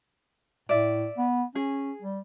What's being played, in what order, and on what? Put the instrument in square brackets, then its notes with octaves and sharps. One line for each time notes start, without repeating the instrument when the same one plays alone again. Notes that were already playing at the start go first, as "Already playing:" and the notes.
[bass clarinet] A2 [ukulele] D5 E5
[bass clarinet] B3
[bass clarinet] C#4 [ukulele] G#4
[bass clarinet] G3